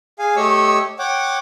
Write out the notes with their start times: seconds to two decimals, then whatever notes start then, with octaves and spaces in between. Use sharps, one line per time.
0.19 G#4 F5 G#5
0.36 A3 G4 C#5 D#5 C#6 E6
0.99 C#5 F#5 G5 D6